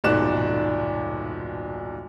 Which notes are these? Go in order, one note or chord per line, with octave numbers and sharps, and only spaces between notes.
D#1 B1 G#2 D5 F#6 E7